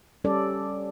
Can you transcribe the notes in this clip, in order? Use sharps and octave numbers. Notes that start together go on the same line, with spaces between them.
G3 C#4 A4 D5